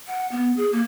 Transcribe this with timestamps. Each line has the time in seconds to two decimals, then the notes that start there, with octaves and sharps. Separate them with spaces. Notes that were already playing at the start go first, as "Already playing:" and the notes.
0.07 F#5
0.32 B3
0.57 G#4
0.72 A#3